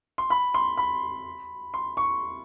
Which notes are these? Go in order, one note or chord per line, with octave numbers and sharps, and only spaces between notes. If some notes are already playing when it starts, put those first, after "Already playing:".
C6
B5
C6
B5
C6
C#6